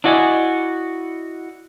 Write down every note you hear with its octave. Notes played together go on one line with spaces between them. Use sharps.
D4 E4 F#4 D5 D#5 G#5